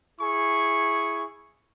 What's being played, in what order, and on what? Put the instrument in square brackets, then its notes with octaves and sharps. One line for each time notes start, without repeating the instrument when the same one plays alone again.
[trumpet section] E4 G#4 C#6